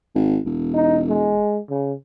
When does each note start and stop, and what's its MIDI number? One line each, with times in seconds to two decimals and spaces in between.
0.15 0.39 32
0.46 1.42 28
0.74 1.01 63
1.09 1.60 56
1.70 1.93 49